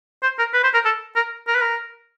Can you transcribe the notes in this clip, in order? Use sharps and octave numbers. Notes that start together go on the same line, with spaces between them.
C5
A#4
B4
C5
A#4
A4
A#4
A#4
B4
A#4